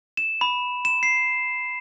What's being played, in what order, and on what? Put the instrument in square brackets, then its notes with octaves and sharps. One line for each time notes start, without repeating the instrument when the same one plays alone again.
[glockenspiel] E7
B5
E7
C7